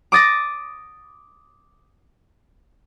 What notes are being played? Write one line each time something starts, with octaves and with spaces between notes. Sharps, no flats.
D6 D#6 A6 A#6